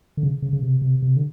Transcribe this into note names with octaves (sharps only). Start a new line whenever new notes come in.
D3
C#3
C#3
C#3
C3
C3
C3
D3